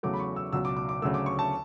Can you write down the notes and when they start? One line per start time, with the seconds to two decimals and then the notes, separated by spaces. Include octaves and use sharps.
0.03 E2 C#3 F#3 A3 D6
0.14 B5
0.20 C#6
0.36 E6
0.53 C#2 B2 F#3 E6
0.65 D6
0.77 D6
0.89 D6
1.02 D2 C#3 F#3 A3 E6
1.14 D6
1.26 C#6
1.39 A5